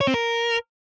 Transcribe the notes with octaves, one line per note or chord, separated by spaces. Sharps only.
C#5
C4
A#4